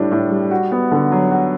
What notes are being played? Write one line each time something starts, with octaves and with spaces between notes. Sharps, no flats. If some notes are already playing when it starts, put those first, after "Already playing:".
Already playing: A2 G3 D4
A2
G3
F#4
B3
D3
F#3
F#4